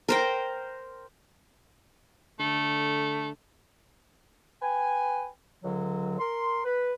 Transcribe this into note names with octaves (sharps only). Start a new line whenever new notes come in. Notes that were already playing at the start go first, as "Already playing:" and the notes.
A#4 C5 G5
D3 A3
B4 G5 G#5
C#2 D3 F#3
A#4 C6
B4